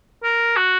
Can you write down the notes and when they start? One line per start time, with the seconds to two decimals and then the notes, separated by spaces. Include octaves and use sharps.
0.24 A#4
0.57 F#4